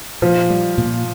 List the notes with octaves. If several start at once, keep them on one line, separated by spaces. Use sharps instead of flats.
A#2 F3
G3
A#2